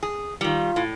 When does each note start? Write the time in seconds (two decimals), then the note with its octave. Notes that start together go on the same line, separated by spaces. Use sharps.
0.03 G#4
0.41 D#3 G3 F4
0.76 A2